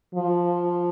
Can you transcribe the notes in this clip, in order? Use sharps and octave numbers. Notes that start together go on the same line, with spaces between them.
F3